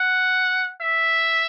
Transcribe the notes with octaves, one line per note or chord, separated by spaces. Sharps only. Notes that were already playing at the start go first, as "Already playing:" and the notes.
Already playing: F#5
E5